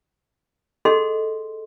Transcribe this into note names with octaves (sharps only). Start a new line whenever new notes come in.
G#4 A4 D#5 F#5 C6